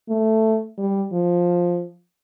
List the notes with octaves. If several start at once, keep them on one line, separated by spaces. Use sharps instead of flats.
A3
G3
F3